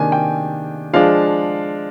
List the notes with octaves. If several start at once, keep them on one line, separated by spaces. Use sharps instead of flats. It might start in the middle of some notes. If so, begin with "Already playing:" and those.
Already playing: C3 D#3 A#3 D4 G#5
G5
F3 G#3 D4 F5